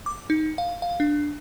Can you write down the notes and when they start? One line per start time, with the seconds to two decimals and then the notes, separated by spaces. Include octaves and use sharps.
0.06 D6
0.30 D#4
0.58 F5
0.82 F5
1.00 D4